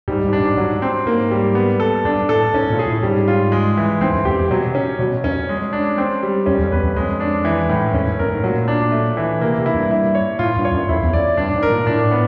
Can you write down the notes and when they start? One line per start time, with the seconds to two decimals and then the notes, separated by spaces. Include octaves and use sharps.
0.08 G#2 G3
0.24 G#2
0.33 D4
0.40 G#2
0.57 G#2 F#3
0.82 C4
1.06 G#2 A#3
1.31 G3
1.55 B3
1.80 A4
2.05 G2 D4
2.29 A2 A4
2.54 G#2 C#4
2.70 A#2
2.79 G#4
2.86 A2
3.03 G#2 G3
3.28 F4
3.52 G#3
3.77 E3
4.01 G#2 C4
4.13 F#2
4.25 F2 G4
4.39 F2
4.50 B2 F#3
4.67 C3
4.75 C#4
4.99 B2 F#3
5.24 F2 C#4
5.49 G#3
5.73 D4
5.98 C4
6.23 G3
6.46 F#2 C#4
6.59 F2
6.71 E2 B4
6.83 F2
6.96 F2 G#3
7.20 D4
7.45 E3
7.69 A2
7.94 F2 C#4
8.07 F#2
8.18 F#2 A#4
8.31 G#2
8.43 A#2 F#3
8.68 D4
8.92 A3
9.17 E3
9.41 C3 A#3
9.58 C3
9.66 E4
9.75 G2
9.91 E4
10.15 C#5
10.39 A2 F4
10.56 G2
10.65 C#5
10.72 F#2
10.89 F2 E4
11.02 E2
11.13 F2 D5
11.37 G2 D4
11.54 G#2
11.63 A#4
11.70 A#2
11.86 A2 D4
12.11 B3